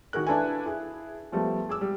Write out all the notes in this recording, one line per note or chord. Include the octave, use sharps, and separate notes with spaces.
D#3 F#4 G#4 A#4 F#6
D4 E4 A4 B4 F5 G#5
E4 G#4
F3 G3 A3 B3
G#4 D6 E6
G3